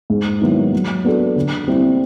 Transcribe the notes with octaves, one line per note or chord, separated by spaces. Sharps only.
G#2
D#3 F#3 B3 E4
F#3
B3 D4 F#4 A4
D3
G3 C4 E4